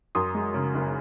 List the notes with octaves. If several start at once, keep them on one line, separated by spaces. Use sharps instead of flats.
F#2 C6 D#6
G#3
C#3
F#1